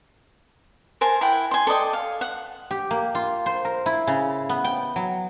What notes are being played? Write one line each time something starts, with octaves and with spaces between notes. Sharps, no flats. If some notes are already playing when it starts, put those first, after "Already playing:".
A#4 C5 G#5 A5
E4 F#5 G5
G#5 C6
A4 D5 D#5 G5
F5
F#5
G4
A#3
F4
C5
A#4
E4
C#3
B3
G5
F#3